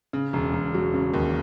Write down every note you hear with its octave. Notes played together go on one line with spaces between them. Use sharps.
C#3
E1
E1
F#3
C#3
D#2